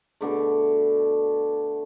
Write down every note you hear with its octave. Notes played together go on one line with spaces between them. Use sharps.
B2 D3 A3